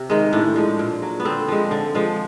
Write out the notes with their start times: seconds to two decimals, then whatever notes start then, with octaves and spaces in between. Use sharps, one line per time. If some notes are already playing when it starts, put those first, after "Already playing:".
Already playing: C3
0.10 D#3 G#3
0.33 A2 D4
0.56 F3 G#3
0.79 A#2
1.02 F#3
1.20 B3
1.25 D3 C4
1.48 F3 G#3
1.71 D3
1.95 F3 G#3